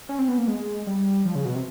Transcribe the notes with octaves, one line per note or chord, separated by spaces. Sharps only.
C#4
C4
B3
A#3
G#3
G3
F3
C#3
B2
C3